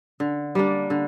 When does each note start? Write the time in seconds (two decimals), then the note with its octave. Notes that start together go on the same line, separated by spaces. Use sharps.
0.20 D3
0.55 G3 A#3 D4
0.90 D3